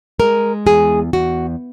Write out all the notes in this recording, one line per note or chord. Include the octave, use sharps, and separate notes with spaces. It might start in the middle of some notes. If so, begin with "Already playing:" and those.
G#3 A#4
E2 G#4
E2 F#4